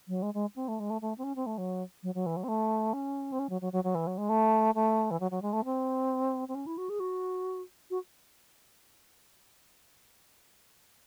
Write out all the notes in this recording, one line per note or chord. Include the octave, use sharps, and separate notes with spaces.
F#3
G#3
G#3
C4
A3
G#3
A3
A3
C4
C#4
C4
A3
F#3
F#3
F#3
E3
F#3
C4
A3
C#4
C4
C#4
F#3
F#3
F#3
F#3
E3
F#3
G#3
A3
A3
E3
F#3
F#3
G#3
A3
C4
C4
C#4
E4
F#4
G#4
F#4
F#4